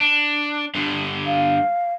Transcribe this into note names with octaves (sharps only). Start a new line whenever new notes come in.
D4
G2 D3
F5